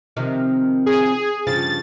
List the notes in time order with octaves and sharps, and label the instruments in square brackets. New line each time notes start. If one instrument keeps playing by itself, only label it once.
[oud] C3 D#3 F3
[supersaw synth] G#4
[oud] G2 C#3 F3 [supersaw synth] A6